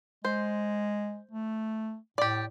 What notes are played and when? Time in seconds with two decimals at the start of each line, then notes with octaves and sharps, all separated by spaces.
0.25 G#3 C5
1.31 A3
2.18 A2 G4 D5